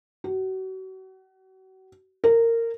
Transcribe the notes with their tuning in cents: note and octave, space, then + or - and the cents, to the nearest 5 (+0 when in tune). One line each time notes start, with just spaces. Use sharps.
F#4 +35
A#4 -20